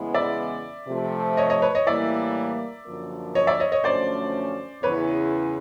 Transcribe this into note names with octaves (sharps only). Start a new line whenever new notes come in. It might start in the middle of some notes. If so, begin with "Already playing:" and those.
Already playing: E2 C#3 E3 G#3 B3
D5 E5
C3 F3 A3
C#5 D#5
C#5 D#5
B4 C#5
C#5 D#5
A2 E3 G3 A#3 D5 E5
F#2 D3 F3 A#3
C#5 D#5
D5 E5
C#5 D#5
C#5 D#5
F#2 D3 F3 A3 C#4 C5 D5
E2 C#3 E3 B4 C#5